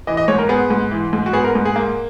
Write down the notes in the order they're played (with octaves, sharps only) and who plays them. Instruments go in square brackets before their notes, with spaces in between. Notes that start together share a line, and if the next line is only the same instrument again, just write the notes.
[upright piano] E3 D#5
D#5
G#2 C#5
A#4
B3 G#4
G#2
E3
G#2
F#4
B3 G#4
A#4
G#2
G#4
A#3